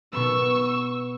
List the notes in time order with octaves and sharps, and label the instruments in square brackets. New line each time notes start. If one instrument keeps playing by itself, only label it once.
[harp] B2 B3 [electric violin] C#6 E6